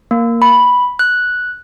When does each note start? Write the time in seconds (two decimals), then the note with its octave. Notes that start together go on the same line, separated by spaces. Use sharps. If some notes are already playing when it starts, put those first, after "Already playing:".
0.11 A#3
0.42 B5
0.99 F#6